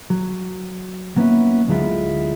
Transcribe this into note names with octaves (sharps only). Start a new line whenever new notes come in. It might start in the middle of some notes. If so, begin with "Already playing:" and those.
F#3
F#3 A#3 B3 C#4 E4
D2 D3 F#3 G#3 E4 F4